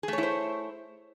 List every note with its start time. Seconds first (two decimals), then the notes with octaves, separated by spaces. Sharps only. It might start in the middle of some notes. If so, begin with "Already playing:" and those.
0.03 G#4
0.08 A3
0.13 C#5
0.18 E4
0.23 C5